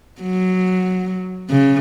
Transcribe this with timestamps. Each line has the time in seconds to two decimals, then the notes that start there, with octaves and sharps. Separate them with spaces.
0.21 F#3
1.50 C#3